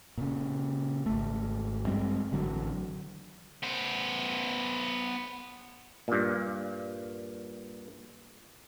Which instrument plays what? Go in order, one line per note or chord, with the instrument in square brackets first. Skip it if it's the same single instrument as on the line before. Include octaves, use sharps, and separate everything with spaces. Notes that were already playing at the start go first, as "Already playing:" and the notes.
[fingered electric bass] A#2 C#3
G#1 A3
G2 G3 G#3 C4
A1 D3 F#3
[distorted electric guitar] B3 C5
[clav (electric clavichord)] G2 A#2